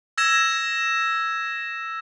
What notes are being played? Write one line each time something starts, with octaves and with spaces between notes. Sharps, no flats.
E6 G#6 A#6 E7